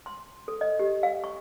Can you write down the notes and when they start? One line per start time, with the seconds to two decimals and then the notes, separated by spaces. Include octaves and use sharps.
0.06 C6
0.48 A4
0.61 D#5
0.79 G4
1.03 F5
1.24 C#6